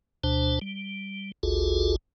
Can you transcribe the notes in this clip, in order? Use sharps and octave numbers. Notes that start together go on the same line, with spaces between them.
D2 B2 D4 C5 A5
G3
G#1 D2 F4 F#4 G#4 A4